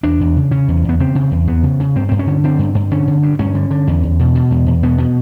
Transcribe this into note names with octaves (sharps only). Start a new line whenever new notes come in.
E2 D4
E2
C#3
C#3 C#4
E2
E2 B3
C#3 C4
C#3
E2
E2 B3
C#3
C#3
G2 C4
G2 C4
C#4
D3
D3 C4
G2
G2
D3 C#4
D3
G2
G2 C#4
D3
D3
E2
E2
B2
B2
E2
E2
B2 B3
B2